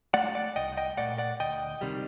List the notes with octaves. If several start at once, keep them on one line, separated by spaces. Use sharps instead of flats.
A3 D5 F#5
D5 F#5
C2 D#5 G5
D#5 G5
A#2 A3 D5 F#5
D5 F#5
D2 D#5 G5
C3 D#3 G3